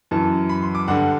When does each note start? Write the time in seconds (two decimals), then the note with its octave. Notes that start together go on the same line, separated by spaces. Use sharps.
0.11 F#2 E3 A5
0.49 B5
0.62 C6
0.75 D6
0.88 G2 D3 F#5